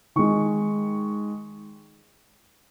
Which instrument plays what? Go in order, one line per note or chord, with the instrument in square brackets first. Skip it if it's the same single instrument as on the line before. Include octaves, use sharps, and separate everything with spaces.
[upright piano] D#3 G#3 C#6